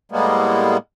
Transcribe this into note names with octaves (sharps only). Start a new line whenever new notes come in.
A2 G3 G#3 A#3 B3